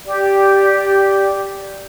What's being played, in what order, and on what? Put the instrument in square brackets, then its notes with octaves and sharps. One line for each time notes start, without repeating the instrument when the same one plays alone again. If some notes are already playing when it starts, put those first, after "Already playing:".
[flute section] G4 D5